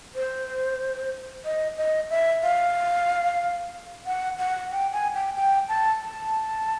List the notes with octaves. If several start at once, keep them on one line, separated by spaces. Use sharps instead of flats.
C5
D#5
D#5
E5
F5
F#5
F#5
G5
G#5
G5
G5
A5
A5